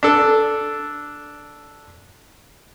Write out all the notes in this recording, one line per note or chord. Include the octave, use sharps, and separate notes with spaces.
D4 A4